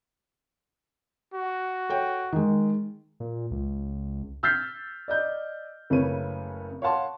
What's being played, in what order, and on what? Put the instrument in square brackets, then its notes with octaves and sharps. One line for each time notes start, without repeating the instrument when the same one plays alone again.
[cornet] F#4
[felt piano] A4 C#5 G5
D#3 G#3
[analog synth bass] A#2
C#2
[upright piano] E6 F6 G6 A6 B6 C7
D5 D#5 G6
F#1 C#3 A3 B4 C#5 D#7
C#5 F5 F#5 A5 C6